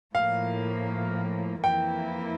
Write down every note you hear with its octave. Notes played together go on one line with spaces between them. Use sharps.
A2 F3 A#3 F5
F2 E3 A#3 E4 G5